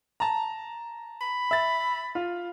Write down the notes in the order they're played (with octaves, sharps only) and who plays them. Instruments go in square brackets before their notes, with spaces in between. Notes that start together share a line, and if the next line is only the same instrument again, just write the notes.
[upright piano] A5 A#5
[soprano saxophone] B5
[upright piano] E5 A6
F4